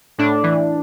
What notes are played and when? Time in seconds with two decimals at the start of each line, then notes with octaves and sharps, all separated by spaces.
0.18 A2 D4
0.43 E3